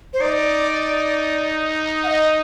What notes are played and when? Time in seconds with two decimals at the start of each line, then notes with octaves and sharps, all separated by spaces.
0.13 C5
0.21 D#4 D5
2.03 F#5
2.08 D#5